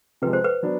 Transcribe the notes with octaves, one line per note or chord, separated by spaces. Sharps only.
C3 F3 G#3 B4
C5
B4
F#3 B3 D4